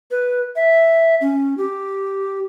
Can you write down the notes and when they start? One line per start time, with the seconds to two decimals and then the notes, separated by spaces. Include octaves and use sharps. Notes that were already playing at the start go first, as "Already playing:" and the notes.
0.11 B4
0.56 E5
1.21 C#4
1.58 G4